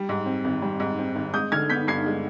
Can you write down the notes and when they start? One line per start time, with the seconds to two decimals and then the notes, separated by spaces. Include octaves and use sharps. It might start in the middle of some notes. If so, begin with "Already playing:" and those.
Already playing: G3
0.09 G#2
0.26 C4
0.44 G#1
0.62 G3
0.80 G#2
0.99 C4
1.16 G#1
1.34 G#3 D#6 G6
1.52 D3 F6 G#6
1.70 B3 G6 B6
1.87 G2 G#6 C7
2.06 G#3